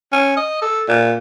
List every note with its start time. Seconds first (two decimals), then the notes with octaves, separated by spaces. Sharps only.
0.12 C#4
0.37 D#5
0.62 A4
0.88 A#2